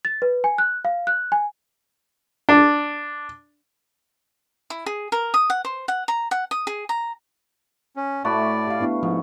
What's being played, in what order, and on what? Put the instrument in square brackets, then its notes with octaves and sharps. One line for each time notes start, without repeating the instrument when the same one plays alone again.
[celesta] A6
B4
G#5
F#6
F5
F#6
G#5
[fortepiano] D4
[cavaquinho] E4
G#4
A#4
D#6
F#5
C5
F#5
A#5
F#5
D#6
G#4
A#5
[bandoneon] C#4
[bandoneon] A2 D5 [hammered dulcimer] A3 F#4 B5
[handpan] G4 F5
B3 D4 E4
[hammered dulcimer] G#2 [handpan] F3